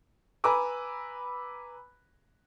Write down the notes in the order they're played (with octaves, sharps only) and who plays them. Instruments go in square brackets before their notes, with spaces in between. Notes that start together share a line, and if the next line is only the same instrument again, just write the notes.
[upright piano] B4 G#5 A#5 B5 D6 E6